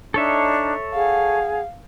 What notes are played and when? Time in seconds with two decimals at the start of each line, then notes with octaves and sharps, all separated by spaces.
0.14 D4 D#4 A4 C#5 D5 E5
0.94 G#4 F5 F#5